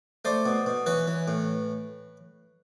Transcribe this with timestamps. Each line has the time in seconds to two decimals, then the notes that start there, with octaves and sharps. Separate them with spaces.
0.25 A3 C5 D5
0.46 B2
0.66 B2
0.86 E3 B4 C#5
1.07 E3
1.28 A2